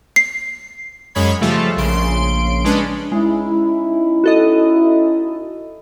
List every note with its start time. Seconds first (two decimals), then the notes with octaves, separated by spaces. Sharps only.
0.16 C7
1.15 F#2 G#3 C#5 B5 G#6
1.41 C#3 F3 G3 A3 F4 A4
1.77 A#1 C#3 C6 D7
2.64 G#3 C#4 D4 B4
3.12 G#3 C#4 D#4 E4
4.24 F#4 A4 D#5